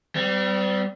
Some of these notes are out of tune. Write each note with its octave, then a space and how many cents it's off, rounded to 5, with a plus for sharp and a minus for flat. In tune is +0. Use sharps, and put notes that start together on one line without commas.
G3 -20 C4 -40